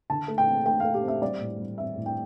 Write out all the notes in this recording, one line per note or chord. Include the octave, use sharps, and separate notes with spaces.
D3 A5
A3
G5
C4
A3 G5
A3 F5
G4
C4
E5
G3 D5
A2
G3
C4 E5
A2
G5